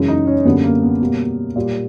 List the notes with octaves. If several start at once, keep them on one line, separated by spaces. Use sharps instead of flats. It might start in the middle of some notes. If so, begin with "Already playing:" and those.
Already playing: F#2 C#3 E3 G#3
D#4
C#4
F#2 D3 G3 A#3 B3
A#3
B3
B2 G3 A#3
A#2 G3 A#3